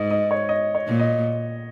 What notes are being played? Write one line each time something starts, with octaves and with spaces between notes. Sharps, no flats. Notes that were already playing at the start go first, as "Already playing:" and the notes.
Already playing: G#2 D#5
D#5
C#5
D#5
C#5
A#2
D#5